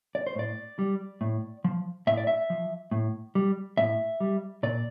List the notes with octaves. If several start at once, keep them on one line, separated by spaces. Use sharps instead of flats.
D5
C5
A2 D5
G3
A2
F3
A2 E5
D5
E5
F3
A2
G3
A2 E5
G3
A#2 D5